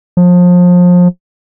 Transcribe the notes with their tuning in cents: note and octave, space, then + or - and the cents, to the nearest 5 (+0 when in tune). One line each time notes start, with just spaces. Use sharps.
F3 +30